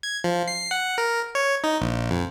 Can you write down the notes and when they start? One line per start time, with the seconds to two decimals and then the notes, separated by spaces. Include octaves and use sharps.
0.03 G#6
0.24 F3
0.48 C7
0.71 F#5
0.98 A#4
1.35 C#5
1.64 D#4
1.81 A#1
2.11 F2